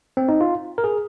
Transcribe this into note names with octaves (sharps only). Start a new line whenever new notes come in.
C4
D#4
F4
A#4
G#4